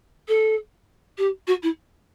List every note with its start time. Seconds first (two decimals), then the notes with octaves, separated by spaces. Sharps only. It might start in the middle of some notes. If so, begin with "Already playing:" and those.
0.28 A4
1.18 G4
1.47 F#4
1.63 E4